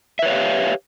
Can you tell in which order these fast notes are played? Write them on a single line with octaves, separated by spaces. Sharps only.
E5 B4 C#5 F5 G4